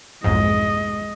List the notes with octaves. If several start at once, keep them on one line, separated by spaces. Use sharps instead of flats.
B1 F2 G#2 G#3 D#5